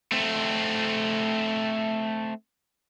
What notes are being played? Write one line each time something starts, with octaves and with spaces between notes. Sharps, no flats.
A3 C4